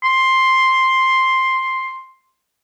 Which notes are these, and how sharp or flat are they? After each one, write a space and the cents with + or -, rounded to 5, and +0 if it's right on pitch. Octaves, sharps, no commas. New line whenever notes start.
C6 +5